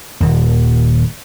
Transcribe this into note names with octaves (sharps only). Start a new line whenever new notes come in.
D#1 D#2